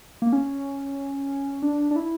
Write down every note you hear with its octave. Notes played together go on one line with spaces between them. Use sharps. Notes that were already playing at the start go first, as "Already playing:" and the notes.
A#3
C#4
D4
D4
E4